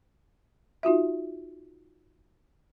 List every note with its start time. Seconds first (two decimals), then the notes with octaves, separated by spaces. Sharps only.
0.83 D#4 F4 F#4 E5